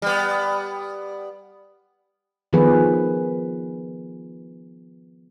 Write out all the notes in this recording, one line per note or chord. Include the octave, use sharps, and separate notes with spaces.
G3 B3
D#3 F3 B3 G#4 B4